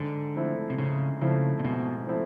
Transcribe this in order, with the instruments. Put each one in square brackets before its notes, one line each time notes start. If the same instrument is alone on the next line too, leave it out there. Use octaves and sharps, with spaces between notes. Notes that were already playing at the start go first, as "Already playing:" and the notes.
Already playing: [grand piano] G#2 [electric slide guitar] D3
[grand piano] F3 A3 C4 E4
[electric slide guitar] C3
[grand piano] G#2 [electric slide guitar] C#3
[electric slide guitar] C#3 [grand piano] F3 A3 C4 E4
[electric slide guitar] A#2
[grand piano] G#2 [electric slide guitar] B2
[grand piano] F3 A3 C4 E4